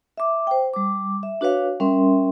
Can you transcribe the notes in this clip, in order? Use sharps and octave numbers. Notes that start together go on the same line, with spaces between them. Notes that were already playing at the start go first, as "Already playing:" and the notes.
E5 D6
C5 G5
G3 D6
E5
D4 F#4 B4 C#5 F5
G3 C#4 A#4 E5 C6